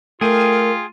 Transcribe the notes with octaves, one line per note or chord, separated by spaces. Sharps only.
A3 F4 G#4 A#4 G5 D#7